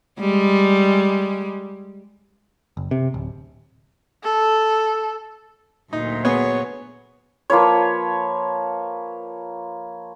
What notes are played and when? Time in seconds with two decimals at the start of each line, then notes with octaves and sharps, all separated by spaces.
0.20 G3 G#3
2.77 F#1
2.91 C3
3.14 D1
4.23 A4
5.93 D2 A#2 F#3 D#4
6.25 B3 G#4 C#5
7.50 F3 A#3 B4 C#5